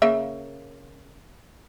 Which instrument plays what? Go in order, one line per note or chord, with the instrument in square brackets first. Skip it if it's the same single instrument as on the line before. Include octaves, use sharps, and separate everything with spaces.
[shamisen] C#3 A#3 E5